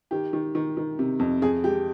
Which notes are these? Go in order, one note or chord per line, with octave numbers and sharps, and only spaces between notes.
D#3 G4
D#3
D#3
D#3
C3
F2
F2 G#4
G#3 G4